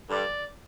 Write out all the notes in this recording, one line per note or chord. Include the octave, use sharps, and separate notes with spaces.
G2 D3 G3 D5